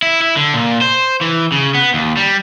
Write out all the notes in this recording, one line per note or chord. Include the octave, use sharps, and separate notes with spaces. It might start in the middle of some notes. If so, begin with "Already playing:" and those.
E4
E4
D3
A#2
C5
E3
C#3
B3
D#2
G3